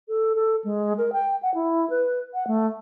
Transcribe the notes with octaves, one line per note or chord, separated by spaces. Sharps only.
A4
A4
G#3
A#4
G5
F#5
E4
B4
F#5
A3